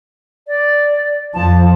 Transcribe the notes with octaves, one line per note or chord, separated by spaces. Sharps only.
D5
F2 F3 A5